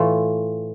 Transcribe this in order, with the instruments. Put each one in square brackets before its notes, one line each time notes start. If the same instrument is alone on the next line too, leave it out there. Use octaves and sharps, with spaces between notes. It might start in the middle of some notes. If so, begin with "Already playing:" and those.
Already playing: [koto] A2 E3 A3 F4